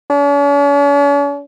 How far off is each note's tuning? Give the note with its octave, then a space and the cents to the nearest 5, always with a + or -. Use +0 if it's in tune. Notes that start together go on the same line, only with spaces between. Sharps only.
C#4 +45